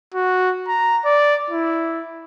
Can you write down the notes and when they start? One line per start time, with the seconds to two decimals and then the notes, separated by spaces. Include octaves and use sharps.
0.14 F#4
0.68 A#5
1.05 D5
1.50 E4